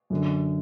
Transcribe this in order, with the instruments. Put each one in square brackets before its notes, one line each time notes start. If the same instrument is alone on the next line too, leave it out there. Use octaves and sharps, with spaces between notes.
[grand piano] F#2 D3